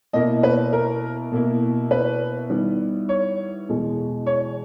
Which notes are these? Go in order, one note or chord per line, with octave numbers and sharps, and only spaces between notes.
B2 A#3 E4 D#5
B4
A#4
B2 A#3 E4
B4
D#3 G3 B3 E4
C#5
E2 B2 G#3
C#5